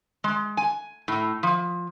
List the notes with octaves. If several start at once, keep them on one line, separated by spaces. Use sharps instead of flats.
G#3
G#5
A2
F3